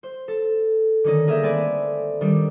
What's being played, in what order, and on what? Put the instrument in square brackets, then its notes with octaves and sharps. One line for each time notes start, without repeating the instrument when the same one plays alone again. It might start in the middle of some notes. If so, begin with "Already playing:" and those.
[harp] C5
A4
D3 D#3 C#4 D#4
A#3 G#4 A#4 E5 G6
A3 C4 B4 D5 G#5
D#3 G3 D4